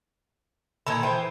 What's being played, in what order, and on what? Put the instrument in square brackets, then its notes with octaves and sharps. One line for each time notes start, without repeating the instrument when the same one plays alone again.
[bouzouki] A#2 D#3 A4 [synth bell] B5 G#6
[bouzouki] E3 C5 G5